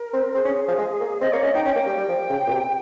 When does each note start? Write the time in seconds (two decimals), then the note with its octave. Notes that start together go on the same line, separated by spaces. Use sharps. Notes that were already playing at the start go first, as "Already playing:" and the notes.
Already playing: A#4
0.13 C4
0.34 C4 G#4
0.45 C#4
0.68 F3
0.78 G#3
1.00 A#3
1.21 C4 D#5
1.32 A#3 C#5
1.43 C#4 D#5
1.54 D#4 G5
1.65 C#4 G5
1.75 A#3
1.86 G3
1.97 G3
2.08 F3
2.30 C#3
2.47 A#2
2.51 C3